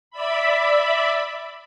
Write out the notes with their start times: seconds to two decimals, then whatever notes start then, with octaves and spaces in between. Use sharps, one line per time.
0.11 D5 E5 B5